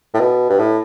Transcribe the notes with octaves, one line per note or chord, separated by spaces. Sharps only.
A2
B2
G2
A2